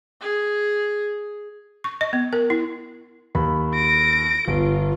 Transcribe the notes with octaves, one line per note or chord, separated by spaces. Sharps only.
G#4
C#6
D#5
B3
A#4
E4
D#2 B5
A#6 D7
G1 F4